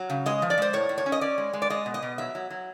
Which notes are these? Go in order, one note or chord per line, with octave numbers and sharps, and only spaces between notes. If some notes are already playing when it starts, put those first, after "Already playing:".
Already playing: F#3
C#3
G#3 D#5
F3
D5
G#3 C5
A2 C#5
A2
C#5
C#4
D#5
C#4 D5
G#3
G#3
D5
G#3 D#5
B2
D#5
B2
F#3 E5
F#3
F#3